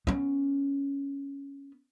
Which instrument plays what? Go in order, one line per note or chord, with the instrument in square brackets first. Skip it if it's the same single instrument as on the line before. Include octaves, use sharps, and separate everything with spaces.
[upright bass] B3 C#4